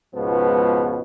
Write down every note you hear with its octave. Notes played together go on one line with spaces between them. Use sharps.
C#2 G#2 B2 F3 B3